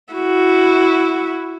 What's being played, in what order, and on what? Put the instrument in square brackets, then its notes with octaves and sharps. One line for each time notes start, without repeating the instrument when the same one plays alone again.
[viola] E4 F#4